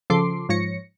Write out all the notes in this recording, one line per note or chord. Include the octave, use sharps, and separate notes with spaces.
C#3 F3 A4 C6 D6 C7
G#2 F3 C#5 A#6 C#7